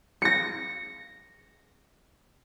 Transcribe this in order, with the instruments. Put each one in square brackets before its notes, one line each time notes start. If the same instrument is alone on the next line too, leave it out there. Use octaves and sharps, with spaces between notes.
[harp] A#6 C#7